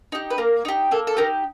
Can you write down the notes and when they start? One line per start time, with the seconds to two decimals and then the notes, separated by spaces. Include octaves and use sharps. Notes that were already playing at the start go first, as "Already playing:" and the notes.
0.12 D#4 G4
0.30 B4
0.38 A#3 A#4
0.65 D#4 G4
0.91 A#3 A4
1.07 A4
1.17 D#4 G4 A#4